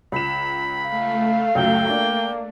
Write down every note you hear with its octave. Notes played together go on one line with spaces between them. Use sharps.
C#2 B5 E7
A3 F5
C#2 F#2 G5
A#3 D4